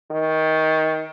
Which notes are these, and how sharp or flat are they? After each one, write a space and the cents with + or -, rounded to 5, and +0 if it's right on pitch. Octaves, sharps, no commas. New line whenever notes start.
D#3 +20